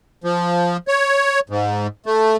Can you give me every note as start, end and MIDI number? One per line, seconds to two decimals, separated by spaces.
0.24 0.77 53
0.88 1.40 73
1.50 1.87 44
2.06 2.37 57